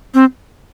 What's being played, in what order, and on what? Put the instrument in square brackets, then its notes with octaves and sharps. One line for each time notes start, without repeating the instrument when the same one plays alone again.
[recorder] C4